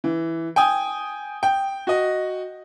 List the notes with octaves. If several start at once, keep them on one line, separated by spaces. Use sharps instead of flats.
E3
G5 G#5 D#6
G5
F#4 D#5